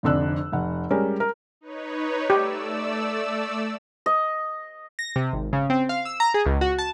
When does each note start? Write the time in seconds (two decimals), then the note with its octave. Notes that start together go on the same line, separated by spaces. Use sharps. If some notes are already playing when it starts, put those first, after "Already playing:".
0.03 F1 F2 D3 E6 F#6
0.52 F1 F#5
0.91 G3 G#3 C#4 A#4
1.20 A#4
1.61 D#4 B4 C#5
2.30 A3 G4 D5 E6
4.06 D#5
4.99 A#6
5.16 C3
5.33 G#1
5.53 C#3
5.70 C4
5.89 F5
6.05 E6
6.20 A#5
6.34 G#4
6.46 C#2
6.61 F#4
6.78 A5